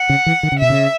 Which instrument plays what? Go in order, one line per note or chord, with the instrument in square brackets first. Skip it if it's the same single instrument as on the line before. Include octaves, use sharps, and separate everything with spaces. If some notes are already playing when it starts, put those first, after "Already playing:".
Already playing: [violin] F#5
[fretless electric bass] C#3
E3
D#3
C#3
[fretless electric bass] B2 [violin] E5
[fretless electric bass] C#3